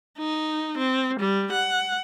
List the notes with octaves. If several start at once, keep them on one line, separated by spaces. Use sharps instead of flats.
D#4
C4
G3
F#5